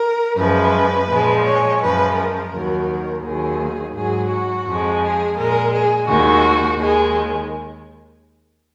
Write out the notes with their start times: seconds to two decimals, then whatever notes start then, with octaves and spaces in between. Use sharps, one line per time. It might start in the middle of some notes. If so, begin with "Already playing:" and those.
Already playing: A#4
0.37 F#2 F3 G#3 B4
1.09 A#2 F3 G#3
1.45 C#5
1.80 F#2 F3 G#3 B4
2.17 A#4
2.52 D#2 D#3 F#3
3.23 D#2 D#3 F#3 G#4
3.94 G#2 F#3 G#4
4.30 F#4
4.66 F2 F3 G#3
5.01 G#4
5.37 A#2 G#3 A#4
5.73 G#4
6.08 D#2 D#3 G#3 F#4
6.79 D#2 D#3 G#3 G#4